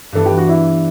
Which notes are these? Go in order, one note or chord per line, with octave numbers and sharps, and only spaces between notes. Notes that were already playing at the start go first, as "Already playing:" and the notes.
G2 E3 B3 D4 A4
G4
F#4
E4